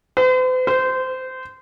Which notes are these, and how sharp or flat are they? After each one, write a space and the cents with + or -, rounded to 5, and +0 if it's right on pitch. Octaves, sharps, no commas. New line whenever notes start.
C5 -45
C5 -20